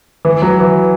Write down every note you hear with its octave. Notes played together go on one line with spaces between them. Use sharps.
E3
F#3
E3